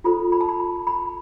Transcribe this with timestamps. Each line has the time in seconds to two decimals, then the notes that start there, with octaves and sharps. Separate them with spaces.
0.04 F4 A4 C5 B5
0.32 B5
0.41 A5
0.49 B5
0.60 B5
0.87 B5